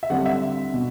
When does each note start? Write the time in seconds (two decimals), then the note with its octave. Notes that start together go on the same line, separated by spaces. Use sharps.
0.03 E5
0.10 D3 G3 C4 F#5
0.26 E5
0.74 B2